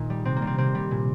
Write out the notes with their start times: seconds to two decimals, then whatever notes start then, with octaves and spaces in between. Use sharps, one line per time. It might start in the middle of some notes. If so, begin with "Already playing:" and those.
Already playing: A#2 D#3 D#4
0.10 G3
0.25 C3 C4
0.36 A#3
0.42 G3
0.47 C4
0.58 C3 C4
0.75 G3
0.91 A#2